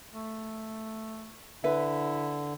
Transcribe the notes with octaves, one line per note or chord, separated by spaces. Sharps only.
A3
D3 E4 B4 E5